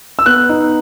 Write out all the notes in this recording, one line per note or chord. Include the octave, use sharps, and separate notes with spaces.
E6
B3 F#6
D#4